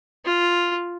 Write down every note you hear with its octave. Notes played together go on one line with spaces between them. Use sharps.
F4